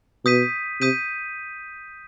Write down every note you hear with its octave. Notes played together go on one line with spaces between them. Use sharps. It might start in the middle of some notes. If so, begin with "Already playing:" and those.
B2 D#6 G6 B6 D#7
C3 D#6 G6 B6 D#7